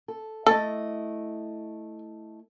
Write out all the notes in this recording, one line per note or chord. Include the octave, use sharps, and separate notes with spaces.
A4
A3 E4 A4 D#5